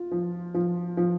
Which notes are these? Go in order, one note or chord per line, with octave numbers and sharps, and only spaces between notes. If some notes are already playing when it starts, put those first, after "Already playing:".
Already playing: F4
F3
F3
F3